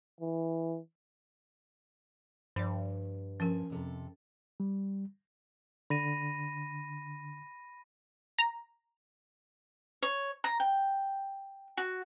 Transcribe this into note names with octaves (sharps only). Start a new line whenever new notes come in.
E3
G2 F3 D5
F3 C#4 A#4 G#5
F2 C3 A4
G3
D3 B5 A#6 D#7
A#5
C#5
A#5
G5
F#4